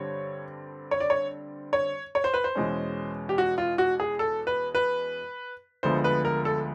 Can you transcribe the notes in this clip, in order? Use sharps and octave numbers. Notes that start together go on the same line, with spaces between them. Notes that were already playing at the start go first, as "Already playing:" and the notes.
Already playing: G2 D3 G3 C4 C#5
C#5
D5
C#5
C#5
C#5
C5
B4
C5
E2 B2 G#3 C#4
G4
F#4
F4
F#4
G#4
A4
B4
B4
D2 D3 F3 G#3 B3 C5
B4
A#4
A4